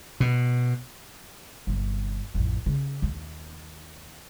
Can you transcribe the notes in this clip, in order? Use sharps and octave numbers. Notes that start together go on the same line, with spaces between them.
B2
G1 C3
A1 F2
C#3
D#2